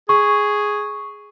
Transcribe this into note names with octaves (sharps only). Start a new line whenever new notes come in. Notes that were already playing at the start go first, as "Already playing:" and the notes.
G#4 C#6